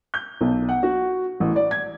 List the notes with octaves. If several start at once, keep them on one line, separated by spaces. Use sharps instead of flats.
G6
B1
F#5
F#4
A1
D5
G#6